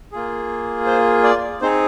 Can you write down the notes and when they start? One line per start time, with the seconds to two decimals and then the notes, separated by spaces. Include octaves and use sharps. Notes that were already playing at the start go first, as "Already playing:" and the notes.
0.12 A#3 F4 G#4
0.86 C5
1.23 D5
1.62 C4 D#4 G#4 C5